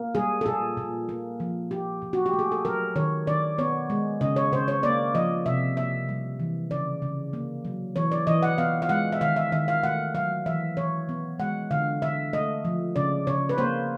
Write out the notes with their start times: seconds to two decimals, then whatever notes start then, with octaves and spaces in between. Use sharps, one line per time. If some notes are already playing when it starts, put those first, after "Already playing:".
Already playing: A#3
0.15 G3 G#4
0.41 A4
0.46 A#2 G#4
0.77 A#2
1.09 A#3
1.40 F3
1.71 A#2 G4
2.02 A#2
2.13 F#4
2.26 G4
2.33 A3
2.39 G#4
2.52 A4
2.65 F#3 A#4
2.96 D#3 C#5
3.27 D#3 D5
3.58 B3 C#5
3.90 G#3
4.21 C#3 D#5
4.36 C#5
4.52 C#3 C5
4.68 C#5
4.83 A#3 D5
5.15 F3 D#5
5.46 C3 E5
5.77 A#3 E5
6.09 G3
6.40 E3
6.71 C#3 D5
7.02 C#3
7.33 A#3
7.65 F#3
7.96 E3 C#5
8.12 D5
8.27 E3 D#5
8.43 F#5
8.58 B3 F5
8.82 F5
8.89 G#3 F#5
9.12 E5
9.21 D#3 F5
9.36 E5
9.52 D#3 E5
9.68 F5
9.83 A3 F#5
10.15 F#3 F5
10.46 E3 E5
10.77 E3 C#5
11.09 B3
11.39 G#3 F#5
11.71 D3 F5
12.02 D3 E5
12.33 A3 D#5
12.65 F3
12.96 C#3 D5
13.27 C#3 C#5
13.49 B4
13.58 A#3 C5